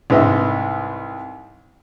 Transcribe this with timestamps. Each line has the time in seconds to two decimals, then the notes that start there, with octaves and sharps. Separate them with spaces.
0.10 C2 G#2 B4 D#5 E5